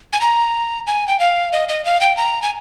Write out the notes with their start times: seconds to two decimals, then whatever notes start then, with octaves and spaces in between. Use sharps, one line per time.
0.13 G#5
0.21 A#5
0.87 G#5
1.08 G5
1.20 F5
1.53 D#5
1.69 D#5
1.85 F5
2.01 G5
2.17 A#5
2.42 G#5